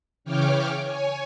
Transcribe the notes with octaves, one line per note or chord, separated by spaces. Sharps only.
C#3 E3 C#5 G5 D6 F6
C#5 G#5